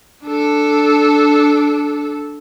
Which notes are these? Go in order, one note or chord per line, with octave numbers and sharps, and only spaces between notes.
D4 A4